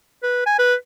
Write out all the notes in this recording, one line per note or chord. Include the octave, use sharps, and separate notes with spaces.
B4
G#5
B4